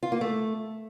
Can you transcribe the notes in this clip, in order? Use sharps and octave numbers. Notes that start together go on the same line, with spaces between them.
F4
A#3
A3